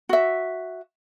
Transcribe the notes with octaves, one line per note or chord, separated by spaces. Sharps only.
F#4 E5